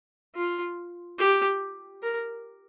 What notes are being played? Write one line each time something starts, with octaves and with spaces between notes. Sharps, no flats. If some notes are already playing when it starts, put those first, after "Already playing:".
F4
G4
A#4